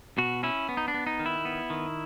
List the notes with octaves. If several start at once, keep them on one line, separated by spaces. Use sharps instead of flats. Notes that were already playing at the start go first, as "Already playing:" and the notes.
B2 F#4
C#4 E4
B3
D#4
D4
B3
D#4
D#3
E4
B3
D#3